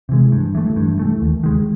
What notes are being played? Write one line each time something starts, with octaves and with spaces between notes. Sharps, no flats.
C3 E3 G#3
G2
E3 A3
G2
E3 A3
D#2
D#3 G#3